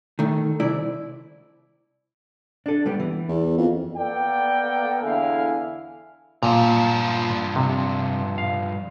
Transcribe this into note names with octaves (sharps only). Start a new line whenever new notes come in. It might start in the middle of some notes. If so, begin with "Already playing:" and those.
D#3 A3
C2 E4 D5
D4 A4
G3 B3 G4
E3
E2
F2
A#3 B3 A4 D5 G5
E2 D3 E4 F5 G#5
G2 A#2 F3
C3
F5